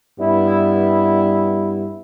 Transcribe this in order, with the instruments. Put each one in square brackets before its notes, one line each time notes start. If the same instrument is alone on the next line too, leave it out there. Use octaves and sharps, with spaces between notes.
[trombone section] G2 G3 B3 E4